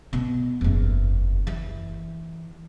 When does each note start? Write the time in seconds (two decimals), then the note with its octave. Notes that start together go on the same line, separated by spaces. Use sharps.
0.13 B2
0.61 F#1 E2
1.47 E3